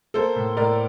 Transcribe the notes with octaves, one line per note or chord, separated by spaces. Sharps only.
A#3 A4 C5
A2
A2 A#4 D5